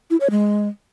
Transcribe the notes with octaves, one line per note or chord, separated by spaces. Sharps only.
E4
C#5
G#3